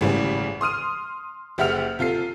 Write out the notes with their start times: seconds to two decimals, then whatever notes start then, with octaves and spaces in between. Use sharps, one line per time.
0.01 G#1 A2 C#3 E3 G3
0.61 C6 D#6 F6 D#7
1.58 F#1 G4 E5 F#5 F6 F7
1.99 C3 F4 A4 C7